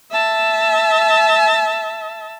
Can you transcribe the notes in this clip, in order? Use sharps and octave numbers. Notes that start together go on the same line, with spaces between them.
E5 A5